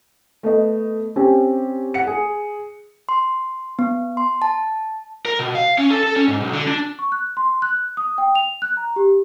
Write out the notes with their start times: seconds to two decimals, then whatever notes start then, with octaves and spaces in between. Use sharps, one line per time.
0.43 A3 B3 D#5
1.16 C4 C#4 G4
1.94 F#5 C#7
2.07 G#4
3.09 C6
3.79 B3
4.17 C6
4.42 A5
5.25 A#4
5.39 B2
5.55 F5
5.78 C#4
5.91 A4
6.03 A4
6.16 C#4
6.28 G#2
6.40 B1
6.53 D3
6.68 D4
6.99 C#6
7.12 F#6
7.37 C6
7.62 F#6
7.97 D#6
8.18 G5
8.35 F7
8.62 F#6
8.77 A#5
8.96 G4